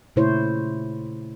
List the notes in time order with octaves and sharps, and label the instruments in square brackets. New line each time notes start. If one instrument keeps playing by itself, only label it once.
[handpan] A#2 C#3 A3 E4 C5 C#5